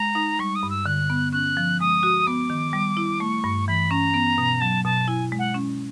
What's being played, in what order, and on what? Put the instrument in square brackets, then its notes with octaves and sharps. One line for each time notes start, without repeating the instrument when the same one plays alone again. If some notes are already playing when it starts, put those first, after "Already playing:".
Already playing: [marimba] G#3 [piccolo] A#5
[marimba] D#4
[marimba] G3 [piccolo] C#6
[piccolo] D#6
[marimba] G2
[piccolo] E6
[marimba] D3 [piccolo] F#6
[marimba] B3
[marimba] C#4 [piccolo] F#6
[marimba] F3
[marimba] G#3 [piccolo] D#6
[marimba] F#4
[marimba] B3 [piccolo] D6
[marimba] D#3
G3
E4
[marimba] A3 [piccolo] C#6
[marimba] G2
[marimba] E3 [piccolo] B5
[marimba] C#4 [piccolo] A#5
[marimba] B3
B2
[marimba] F#3 [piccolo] A5
[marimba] B2 [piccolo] A5
[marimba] E4 [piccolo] G#5
[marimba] G#3
[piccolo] F#5
[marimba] C#4